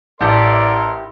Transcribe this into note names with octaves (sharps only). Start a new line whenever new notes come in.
A1 E4 G4 A4 A#4 D5 C6